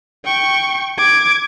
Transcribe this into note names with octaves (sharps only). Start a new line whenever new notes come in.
G5 C#6
D6 G#6